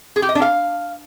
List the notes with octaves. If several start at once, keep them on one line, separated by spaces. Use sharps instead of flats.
G#4
G4
D#5
D4
F5